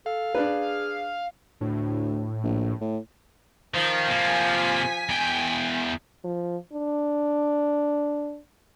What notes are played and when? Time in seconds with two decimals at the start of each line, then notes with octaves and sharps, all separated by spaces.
0.06 A4 F5
0.34 D4 G#4 B4
1.61 D2 A2
2.44 A#1
2.81 A2
3.74 D#3 F3
4.08 C3 A#3 G#5 B6
5.09 E2 G5
6.24 F3
6.73 D4